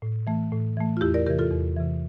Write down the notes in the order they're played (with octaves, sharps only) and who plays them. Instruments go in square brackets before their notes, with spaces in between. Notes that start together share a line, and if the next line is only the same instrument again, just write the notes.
[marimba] A2
E3 A3
A2
E3 A3
F4
E2 E4 G4
A#4 D5
C3 E3 G4 A#4
F4 A4
E2
C3 E3